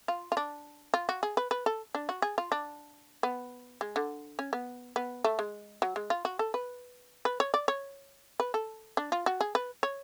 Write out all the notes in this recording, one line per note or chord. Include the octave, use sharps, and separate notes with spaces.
F4
F4
D4
F4
F#4
G#4
B4
B4
A4
D4
F#4
G#4
F4
D4
B3
G#3
D3
C#4
B3
B3
A3
G#3
F#3
G#3
F4
F#4
A4
B4
B4
C#5
D5
C#5
B4
A4
D4
F4
F#4
G#4
B4
C#5